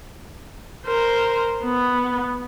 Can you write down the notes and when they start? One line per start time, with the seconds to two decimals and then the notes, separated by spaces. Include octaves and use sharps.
0.87 A#4 C5
1.64 B3